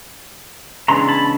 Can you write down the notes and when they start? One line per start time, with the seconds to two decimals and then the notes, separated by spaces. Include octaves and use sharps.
0.88 C#3 E3 G#3 B3 D4 A#5 C6
1.09 A5 B5